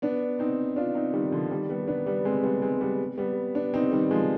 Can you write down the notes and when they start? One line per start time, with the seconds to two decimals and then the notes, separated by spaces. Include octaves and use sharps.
0.02 B3 D4
0.39 C4 D#4
0.76 D4 F4
0.95 C4 D#4
1.13 D#3 G3
1.32 D3 F3
1.51 D#3 G3
1.69 G3 B3
1.88 B3 D4
2.06 G3 B3
2.25 G#3 C4
2.43 G3 B3
2.62 G#3 C4
2.81 G3 B3
3.18 G3 B3
3.55 B3 D4
3.74 C4 D#4
3.92 D#3 G3
4.11 F3 G#3